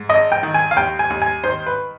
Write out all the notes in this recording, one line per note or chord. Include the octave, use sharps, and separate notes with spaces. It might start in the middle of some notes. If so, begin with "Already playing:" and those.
Already playing: G#2
G#1 D#5
G5
D#3
G#5
F5
D#2 G5
G#5
D#2
G#5
D#3 C5
B4